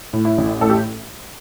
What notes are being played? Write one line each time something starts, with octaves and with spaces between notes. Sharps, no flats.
A2
E4
A1
A2 A4
G4